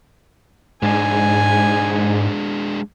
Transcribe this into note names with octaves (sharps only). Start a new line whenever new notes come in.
G#2 G#3 D4 G#5